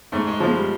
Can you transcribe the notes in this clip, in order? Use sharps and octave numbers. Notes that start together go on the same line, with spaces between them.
G#2 A3
G#3
F3 G#3
G3